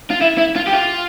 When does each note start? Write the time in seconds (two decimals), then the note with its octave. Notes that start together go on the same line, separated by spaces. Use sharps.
0.10 F4
0.21 E4
0.38 E4
0.56 F4
0.67 G4
0.73 F4